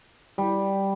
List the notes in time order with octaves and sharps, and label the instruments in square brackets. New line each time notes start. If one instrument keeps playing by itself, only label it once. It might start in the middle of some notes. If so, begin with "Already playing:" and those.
[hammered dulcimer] G3